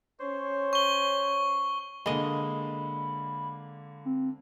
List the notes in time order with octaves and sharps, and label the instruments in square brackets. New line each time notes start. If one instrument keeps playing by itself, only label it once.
[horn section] C#4 C5 C#5
[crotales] C#6 G7
[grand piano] D3 A#3 [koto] G#3 D#5 [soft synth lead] B5
[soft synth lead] C4